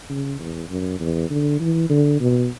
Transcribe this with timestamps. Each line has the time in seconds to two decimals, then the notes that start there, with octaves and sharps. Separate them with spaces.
0.10 C#3
0.39 E2
0.69 F#2
1.00 E2
1.30 D3
1.60 E3
1.90 D3
2.21 B2